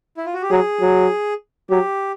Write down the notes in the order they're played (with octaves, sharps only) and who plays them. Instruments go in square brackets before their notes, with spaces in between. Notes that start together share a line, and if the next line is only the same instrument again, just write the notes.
[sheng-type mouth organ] E4
F4
F#4
G4
[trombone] F#3 [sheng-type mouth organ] G#4
[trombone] F#3
[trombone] F#3 [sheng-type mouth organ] G4